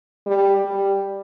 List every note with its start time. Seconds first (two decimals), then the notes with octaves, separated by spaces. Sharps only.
0.26 G3
0.66 G3